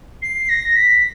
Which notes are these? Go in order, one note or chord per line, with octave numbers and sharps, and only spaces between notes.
C7
A#6
B6